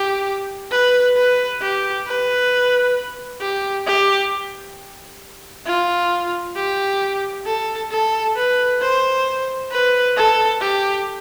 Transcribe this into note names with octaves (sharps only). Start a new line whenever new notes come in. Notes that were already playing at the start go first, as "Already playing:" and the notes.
Already playing: G4
B4
B4
G4
B4
G4
G4
F4
G4
A4
A4
B4
C5
B4
A4
G4